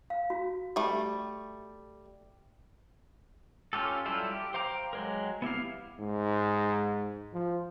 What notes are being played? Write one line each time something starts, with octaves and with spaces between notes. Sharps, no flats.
F5
F#4
G3 A3 G4
C#4 F4 G4 A4
F#3 G3 E4 F4 A4
G4
C5 F5 G5 A#5 D6
F#3 G#3 A#4
B3 E4 G4 F5
G#2
F3